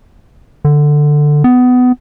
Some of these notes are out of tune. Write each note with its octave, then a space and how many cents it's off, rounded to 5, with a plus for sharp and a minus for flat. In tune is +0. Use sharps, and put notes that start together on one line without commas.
D3 +10
B3 +20